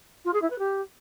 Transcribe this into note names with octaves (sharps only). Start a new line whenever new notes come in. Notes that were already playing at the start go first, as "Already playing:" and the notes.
F4
G#4
E4
B4
G4